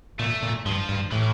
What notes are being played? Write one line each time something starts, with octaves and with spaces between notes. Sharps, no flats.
A#2 A3
A#2
G2 F3
G2
A2 E3